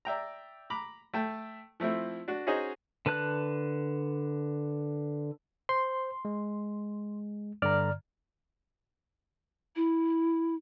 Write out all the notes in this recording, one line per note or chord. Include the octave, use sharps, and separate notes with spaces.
D5 E5 G5 A#5
A#5 B5 D6
A3 G5 A5
F3 A3 C4 E4
D4 F#4
C#4 D#4 F#4 G#4 C5 D#5
D3 B4 A5 F#6
C5 C6
G#3
G2 D3 D5 A#5 F6
E4